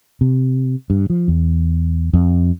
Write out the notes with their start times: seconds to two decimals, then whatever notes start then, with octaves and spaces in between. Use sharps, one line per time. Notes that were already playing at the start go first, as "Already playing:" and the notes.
0.21 C3
0.90 G2
1.10 F3
1.28 E2
2.13 F2